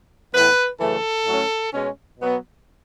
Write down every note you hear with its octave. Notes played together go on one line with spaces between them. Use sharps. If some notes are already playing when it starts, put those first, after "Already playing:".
A2 E3 B3 B4
F#2 C#3 E3 A3 A4
A2 F#3 A3 C#4
B2 G#3 C#4
B2 F#3 B3